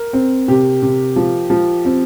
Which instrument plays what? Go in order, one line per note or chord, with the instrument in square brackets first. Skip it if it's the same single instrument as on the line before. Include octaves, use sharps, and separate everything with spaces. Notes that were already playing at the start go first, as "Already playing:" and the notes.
Already playing: [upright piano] A#4
[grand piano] C4
[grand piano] C3 [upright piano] G4
[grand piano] C3
F3
F3
C4